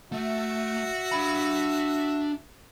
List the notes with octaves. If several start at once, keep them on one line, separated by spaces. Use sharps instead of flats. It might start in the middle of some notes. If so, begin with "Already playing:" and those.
A3 F#4 E5
D4 B5